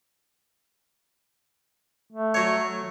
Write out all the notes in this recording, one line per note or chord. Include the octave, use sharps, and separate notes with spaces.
A3
F#3 C#5